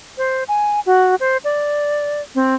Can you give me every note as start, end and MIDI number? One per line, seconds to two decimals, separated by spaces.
0.18 0.44 72
0.48 0.80 80
0.86 1.15 66
1.20 1.37 72
1.44 2.21 74
2.35 2.55 60